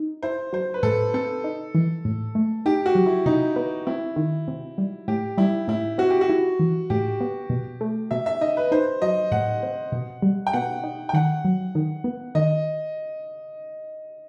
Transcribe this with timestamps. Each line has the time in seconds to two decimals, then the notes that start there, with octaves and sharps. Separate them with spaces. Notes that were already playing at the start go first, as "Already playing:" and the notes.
Already playing: D#4
0.22 E4 C5
0.53 F#3 C5
0.74 B4
0.83 A2 A4
1.14 C4 A4
1.44 D#4
1.75 E3
2.05 A2
2.35 A3
2.66 D#4 G4
2.86 F#4
2.95 F#3
3.06 E4
3.26 C3 D#4
3.56 B3
3.87 C4 E4
4.16 D#3
4.48 C3
4.78 G3
5.08 A2 G4
5.38 G3 E4
5.68 A2 E4
5.98 C4 F#4
6.10 G4
6.21 F#4
6.30 E4
6.59 E3
6.90 A2 G4
7.20 B3
7.50 B2
7.81 A3
8.11 B2 E5
8.26 E5
8.41 D#4 D#5
8.57 B4
8.72 D#4 C5
9.02 F#3 D#5
9.31 A2 F#5
9.63 C4
9.92 B2
10.22 G3
10.47 G5
10.53 B2 F#5
10.84 D#4
11.09 G5
11.13 D#3 F#5
11.45 F#3
11.75 D#3
12.04 B3
12.35 D#3 D#5